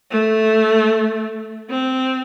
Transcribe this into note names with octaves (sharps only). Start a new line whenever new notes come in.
A3
C4